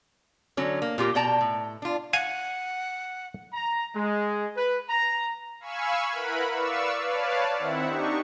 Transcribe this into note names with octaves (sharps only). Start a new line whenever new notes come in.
D3 F#3 C#4
A#3
A#2 F4 G4 A#4
B2 D5 G5 A5 A#5
A2
D4 F4
F5 F#5 G#5
A#5
G#3
B4
A#5
F5 G#5 B5 C#6 E6
E4 A#4 B4 F#5 B5
B4 D5 F5 C#6 E6
B4 C#5 D5 F5 A5
D#3 C4 E4 E5 F#5
D4 D#4 G4 C#6